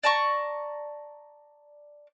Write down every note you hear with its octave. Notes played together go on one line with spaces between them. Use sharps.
D5 A5 A#5 C#6